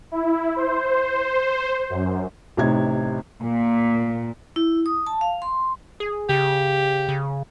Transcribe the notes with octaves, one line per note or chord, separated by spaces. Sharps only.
E4
C5
F#2
A1 C3 D#4 G#6
A#2
E4
D#6
A5
F5
C6
G#4
C#3 G4
C#3